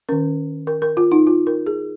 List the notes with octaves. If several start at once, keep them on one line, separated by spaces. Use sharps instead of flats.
D#3 C#4 A#4
A#4
A#4
F4
D#4
F4
A#4
G#4